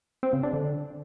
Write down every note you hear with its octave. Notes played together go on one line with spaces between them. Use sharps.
C4
C#3
D4
D3